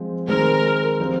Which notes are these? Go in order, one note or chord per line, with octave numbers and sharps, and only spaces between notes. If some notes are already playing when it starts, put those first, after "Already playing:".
Already playing: F3 G#3 C4
D#3 G#3 C4 A#4
F3 C4 G4